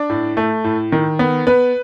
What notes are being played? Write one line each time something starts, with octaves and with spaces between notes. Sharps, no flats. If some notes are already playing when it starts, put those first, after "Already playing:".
Already playing: D4 D5
A2
A3
A2
D#3
B3
B3 B4